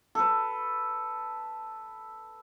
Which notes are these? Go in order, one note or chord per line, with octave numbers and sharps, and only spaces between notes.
A4 B4